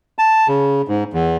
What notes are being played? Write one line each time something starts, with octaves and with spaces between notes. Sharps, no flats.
A5
C#3
G#2
E2